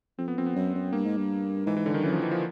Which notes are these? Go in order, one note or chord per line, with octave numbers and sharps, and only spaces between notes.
F2 C4
B3
F2 C4
B3
F#2
F#2
G2 A#3
G#2
G2
G#2 E3
E3
D3
G2 D#3
F#2 E3
F3
E3
F3